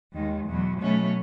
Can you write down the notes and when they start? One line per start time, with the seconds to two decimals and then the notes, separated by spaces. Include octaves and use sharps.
0.13 D#2 D#3 G#3
0.46 E2 B2 F#3
0.80 B2 F#3 A3 C#4